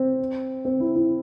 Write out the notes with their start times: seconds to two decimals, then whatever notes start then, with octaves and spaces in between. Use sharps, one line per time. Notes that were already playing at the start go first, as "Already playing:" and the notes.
Already playing: C4
0.65 C4
0.80 E4
0.95 E4